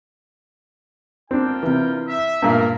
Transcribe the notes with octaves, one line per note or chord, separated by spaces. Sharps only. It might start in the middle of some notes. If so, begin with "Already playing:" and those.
C4 D4 F4 A#4 G5
C3 E3
E5
G2 A#2 A#4